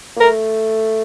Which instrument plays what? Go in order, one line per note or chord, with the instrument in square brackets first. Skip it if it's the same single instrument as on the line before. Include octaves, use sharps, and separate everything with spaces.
[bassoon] A#3
[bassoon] A3 [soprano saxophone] A#4